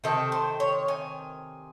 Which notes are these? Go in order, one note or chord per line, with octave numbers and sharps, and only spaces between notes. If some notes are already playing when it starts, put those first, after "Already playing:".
C3 D#3 C4 A4
C5
C#5
G#5